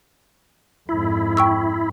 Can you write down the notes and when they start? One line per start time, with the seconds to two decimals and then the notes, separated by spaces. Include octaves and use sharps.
0.89 F2 G#2 E4
1.37 G5 C#6 E6